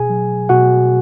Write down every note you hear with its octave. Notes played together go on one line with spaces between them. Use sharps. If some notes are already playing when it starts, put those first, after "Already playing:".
Already playing: B2 G#4 G#5
F#3
B2 F#4 F#5